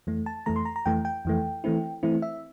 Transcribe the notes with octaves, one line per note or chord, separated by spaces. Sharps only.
F2 E3 A3
A5
F2 E3 A3 A#5
C6
A#5
A#5
F2 E3 A3 G5
G5
F2 E3 A3
E3 A3 C4 E4
E3 A3 C4 E4
E5